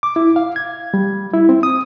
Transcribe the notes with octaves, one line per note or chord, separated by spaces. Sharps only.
D6
E4
F5
G#6
G3
E4
C4
D#6